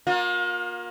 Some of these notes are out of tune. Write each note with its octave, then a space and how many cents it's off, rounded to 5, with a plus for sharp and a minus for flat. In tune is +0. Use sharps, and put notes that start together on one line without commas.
A#3 +20 F4 +40